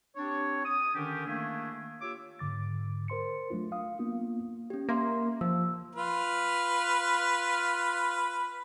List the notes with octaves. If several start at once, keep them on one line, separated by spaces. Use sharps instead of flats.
C4 D4 G4 C#5
D#6
D3 D#3 C#4 D4 G4
D#3 A3 A#3 D4 E4 G#4
A#3 F4 G4 C#5 D6 E6
G#2 D3 D6 A6
A#4 C5 C6 C#7
F#3 A3 D4 F4
F5 D#6
A#3 B3 D4 F4
C#4 G4
A#3 E5 F5 C6
F3 E6
F4 B4 F6